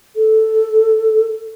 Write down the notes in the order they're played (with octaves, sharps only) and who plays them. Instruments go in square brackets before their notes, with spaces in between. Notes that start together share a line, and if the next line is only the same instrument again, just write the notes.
[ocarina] A4